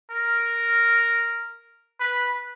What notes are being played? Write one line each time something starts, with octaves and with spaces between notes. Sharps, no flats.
A#4
B4